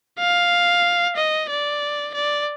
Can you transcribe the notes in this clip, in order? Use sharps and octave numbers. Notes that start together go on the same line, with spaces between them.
F5
D#5
D5
D5